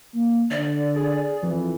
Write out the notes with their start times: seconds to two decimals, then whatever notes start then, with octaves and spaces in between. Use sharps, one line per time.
0.14 A#3
0.51 D3 D5
0.96 G#4
1.43 F2 E3